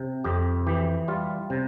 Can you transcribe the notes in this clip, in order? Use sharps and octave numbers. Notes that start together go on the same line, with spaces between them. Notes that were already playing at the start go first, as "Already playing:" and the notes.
Already playing: C3
F2 G4
E3 G4
G3 F4
C3